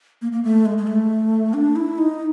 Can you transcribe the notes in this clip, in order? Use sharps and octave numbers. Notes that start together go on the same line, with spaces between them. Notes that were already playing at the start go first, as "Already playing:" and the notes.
A#3
A#3
A3
G#3
G#3
A3
D4
E4
D#4